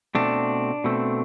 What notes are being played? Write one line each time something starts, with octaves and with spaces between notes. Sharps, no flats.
B2 A3 C4 D4
B2 A3 C4